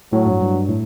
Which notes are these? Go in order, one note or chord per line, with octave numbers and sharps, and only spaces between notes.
A2 F#3
G2
G2
A2